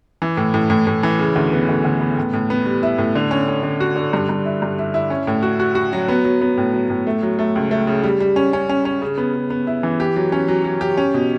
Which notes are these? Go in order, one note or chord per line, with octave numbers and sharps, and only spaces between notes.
E3
A2
A2
A2
A2
E3
C#3
D2
B3
D2
D2
B3
A2
A2
B3
G3
E4
A2
D3
C#4
C#4
D3
F#4
D3
G2
G2
E4
G2
E4
E4
C#4
A2
F#4
F#4
F#4
F#3
B3
F#3
B3
A2
F#3
A2
A3
F#3
A3
C#2
A3
C#3
G3
G3
C#4
C#4
C#4
C#4
C#3
B3
C#3
B3
E4
E3
G4
F#3
C#4
F#3
F#3
G4
C#4
B2